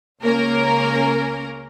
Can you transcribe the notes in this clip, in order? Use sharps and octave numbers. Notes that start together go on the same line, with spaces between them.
C#2 A#3 C#4 A#4